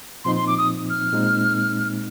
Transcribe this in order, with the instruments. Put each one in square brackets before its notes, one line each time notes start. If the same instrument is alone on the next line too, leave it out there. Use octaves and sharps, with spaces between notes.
[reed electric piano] A#2 F3 C4 D#4 [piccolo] C6
[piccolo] C6
D6
D#6
F6
[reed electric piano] A#2 G#3 C4 D#4